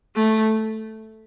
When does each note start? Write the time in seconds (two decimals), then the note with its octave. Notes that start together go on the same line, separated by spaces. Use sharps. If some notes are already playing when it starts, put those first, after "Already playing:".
0.16 A3